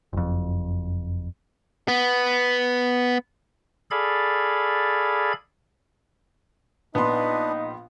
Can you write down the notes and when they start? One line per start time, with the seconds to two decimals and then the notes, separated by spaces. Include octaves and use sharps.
0.13 F#1 F2
1.88 B3
3.91 G#4 A4 D5 F5 B5 G#6
6.95 A#1 B3 D4 D#4 B4 C6